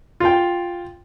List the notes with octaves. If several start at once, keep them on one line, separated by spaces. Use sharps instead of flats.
F4 G5